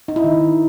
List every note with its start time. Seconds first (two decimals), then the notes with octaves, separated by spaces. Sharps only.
0.08 D#4
0.16 E4
0.24 D#3